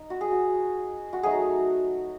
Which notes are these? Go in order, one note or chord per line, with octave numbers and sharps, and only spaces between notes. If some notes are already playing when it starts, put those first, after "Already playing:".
Already playing: D#4
F#4
G#4
F#4
F#4
F#3 A3 D#4 G#4